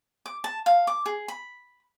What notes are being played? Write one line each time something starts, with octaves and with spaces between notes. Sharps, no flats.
D6
A5
F5
D6
G#4
B5